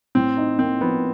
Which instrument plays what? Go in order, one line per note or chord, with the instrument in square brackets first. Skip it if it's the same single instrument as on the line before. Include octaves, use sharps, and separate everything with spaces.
[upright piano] A2 [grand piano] C4
[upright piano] D#4
[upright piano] A#3 [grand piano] C4
[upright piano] F3 [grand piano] B3